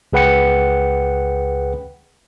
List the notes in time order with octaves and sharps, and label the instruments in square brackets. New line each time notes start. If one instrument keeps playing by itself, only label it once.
[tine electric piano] C#2 G#4 B4 F#5 G5 C#7